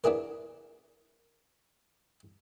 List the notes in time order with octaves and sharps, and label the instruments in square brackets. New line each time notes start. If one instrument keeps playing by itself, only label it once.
[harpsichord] B3 D4 E4 G#4 A#4